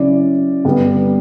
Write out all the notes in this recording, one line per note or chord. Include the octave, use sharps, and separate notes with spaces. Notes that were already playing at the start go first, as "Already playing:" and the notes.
Already playing: C#3 F#3 C#4 E4 D5
G2 D3 G3 B3